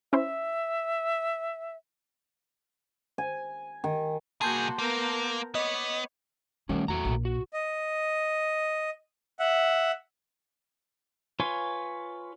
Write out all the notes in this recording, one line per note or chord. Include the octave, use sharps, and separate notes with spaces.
C#4 E4 C5 E5
G#5
D#3
C2 A#3 F#4 G#4 A5 C6 G6
A#3 B3 A#4
B3 C#5 D#5 D6
D#3 G3 A3 C#4
E2 A3 F#4 A#5
A#1 A#2
F#4
D#5
E5 F#5
F4 B4 C#5 G#5 C6